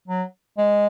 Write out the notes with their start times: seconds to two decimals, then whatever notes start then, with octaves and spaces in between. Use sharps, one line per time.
0.08 F#3
0.58 G#3